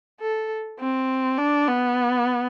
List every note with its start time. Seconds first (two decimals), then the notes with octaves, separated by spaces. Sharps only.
0.20 A4
0.79 C4
1.38 D4
1.67 B3